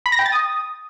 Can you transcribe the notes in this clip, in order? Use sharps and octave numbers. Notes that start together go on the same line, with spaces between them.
B5
A#6
G5
A6
D#6